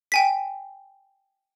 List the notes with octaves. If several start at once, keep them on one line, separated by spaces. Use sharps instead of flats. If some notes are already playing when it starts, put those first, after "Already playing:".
G5 G#5 B6